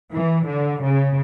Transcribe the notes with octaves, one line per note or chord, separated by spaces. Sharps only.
E3
D3
C#3